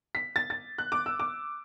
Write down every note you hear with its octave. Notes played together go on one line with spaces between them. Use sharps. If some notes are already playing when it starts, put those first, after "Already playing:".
B6
A6
A6
F#6
D6
E6
D6